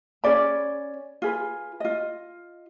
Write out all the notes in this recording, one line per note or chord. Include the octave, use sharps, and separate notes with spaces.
C#4 G#4 D5 B5
F4 G#4 B4
F4 D#5